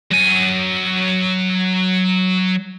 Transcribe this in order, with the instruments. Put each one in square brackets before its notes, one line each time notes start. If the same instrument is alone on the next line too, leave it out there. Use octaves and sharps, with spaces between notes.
[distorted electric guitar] F#3 G#5